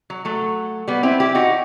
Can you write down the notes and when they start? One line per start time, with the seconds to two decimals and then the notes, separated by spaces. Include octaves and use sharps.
0.10 F#3
0.25 F#3 A3
0.88 G3 B3
1.03 C4 E4
1.20 E4 G4
1.35 D#4 F#4